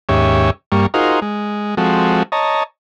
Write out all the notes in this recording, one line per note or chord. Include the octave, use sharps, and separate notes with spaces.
D#2 G#2 C#4 G4 C#5 E5
G2 G3 A#3 C#6
D#4 F4 F#4 G#4 A#4 C5
G#3
F3 G#3 C4 F#4 A4
C#5 D#5 A5 A#5